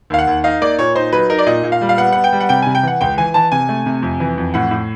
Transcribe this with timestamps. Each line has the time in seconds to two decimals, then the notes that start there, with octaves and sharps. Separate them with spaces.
0.10 D#2 F5
0.18 F#5
0.27 D#2
0.44 D#4 F5
0.62 A#3 D5
0.79 A#2 C#5
0.96 D#4 C5
1.13 F#3 B4
1.30 D#4 A#4
1.39 D5
1.47 A#2 D#5
1.63 A#2
1.72 F5
1.81 G3
1.89 F5
1.97 B3 F#5
2.12 B3 F#5
2.24 G5
2.33 G3
2.40 F#5
2.49 C3 G5
2.62 G#5
2.66 C3
2.75 G5
2.83 E3 F#5
3.01 C#2 G5
3.18 E3 G#5
3.34 E3 A5
3.52 C3 G#5
3.69 A3
3.86 C3
4.02 F2
4.20 E3
4.37 F2
4.54 A2 F#5
4.71 A2